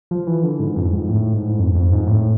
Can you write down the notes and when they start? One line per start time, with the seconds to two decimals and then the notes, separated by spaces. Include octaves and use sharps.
0.11 F3
0.27 E3
0.43 D3
0.60 G#2
0.76 F2
0.92 G#2
1.09 A2
1.34 G#2
1.59 F2
1.75 F2
1.92 G#2
2.07 A2